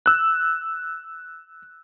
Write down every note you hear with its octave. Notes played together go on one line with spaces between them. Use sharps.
E6 F#6